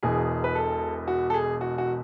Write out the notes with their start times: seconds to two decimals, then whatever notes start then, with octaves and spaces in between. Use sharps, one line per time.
0.03 E1 E2 B2 G#4
0.44 B4
0.55 A4
1.08 F#4
1.30 A4
1.34 G#4
1.61 F#4
1.78 F#4